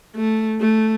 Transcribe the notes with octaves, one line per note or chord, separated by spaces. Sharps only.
A3
A3